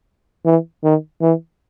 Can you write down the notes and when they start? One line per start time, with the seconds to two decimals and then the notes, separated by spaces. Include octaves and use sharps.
0.45 E3
0.84 D#3
1.21 E3